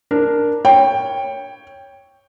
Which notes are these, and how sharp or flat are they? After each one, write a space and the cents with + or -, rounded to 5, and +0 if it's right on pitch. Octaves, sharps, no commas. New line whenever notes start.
D4 +0 A#4 +0
C#5 +0 G5 +10